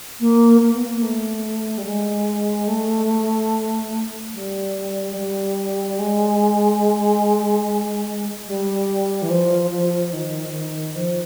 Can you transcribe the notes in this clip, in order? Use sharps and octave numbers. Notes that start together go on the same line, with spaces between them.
A#3
A#3
B3
A#3
A3
G3
G#3
A3
G3
G3
G#3
G3
E3
F3
F3
D#3
F3